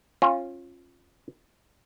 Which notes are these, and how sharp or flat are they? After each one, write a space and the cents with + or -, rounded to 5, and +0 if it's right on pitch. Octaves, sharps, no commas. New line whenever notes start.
C#4 -30 F4 +0